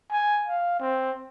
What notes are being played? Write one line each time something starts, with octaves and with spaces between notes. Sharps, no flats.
G#5
F5
C4